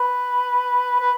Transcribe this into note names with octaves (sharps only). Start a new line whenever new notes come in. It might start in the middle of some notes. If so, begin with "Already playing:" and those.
Already playing: B4
B4